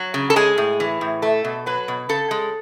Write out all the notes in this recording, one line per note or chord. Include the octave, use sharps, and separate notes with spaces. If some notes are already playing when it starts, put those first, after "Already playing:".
Already playing: F#3 F#4
C#3
A4
G#3 G#4
A2
E3
A2
A3 A4
B2
F#3 B4
B2
C#3 A4
G#3